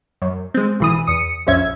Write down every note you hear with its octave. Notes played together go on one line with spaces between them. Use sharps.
F#2
G#3 C4
B1 E3 D#6
E2 D#6 C#7
A#1 F2 C#4 E5 G#6